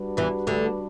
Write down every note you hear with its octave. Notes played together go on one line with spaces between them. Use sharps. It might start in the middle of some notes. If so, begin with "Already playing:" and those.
Already playing: G3 D4 F#4 B4
E2 E3
D2 D3